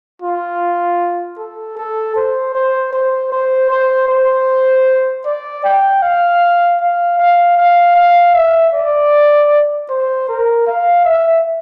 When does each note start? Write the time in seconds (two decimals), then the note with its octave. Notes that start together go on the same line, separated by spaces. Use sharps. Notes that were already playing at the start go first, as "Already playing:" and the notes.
0.22 F4
1.38 A4
1.77 A4
2.16 C5
2.55 C5
2.93 C5
3.32 C5
3.70 C5
4.09 C5
5.26 D5
5.65 G5
6.02 F5
6.81 F5
7.19 F5
7.57 F5
7.96 F5
8.34 E5
8.74 D5
9.89 C5
10.29 A#4
10.67 F5
11.05 E5